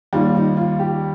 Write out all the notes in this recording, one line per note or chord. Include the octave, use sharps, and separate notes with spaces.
D#2 D#3 G3 F4
D#4
F4
G4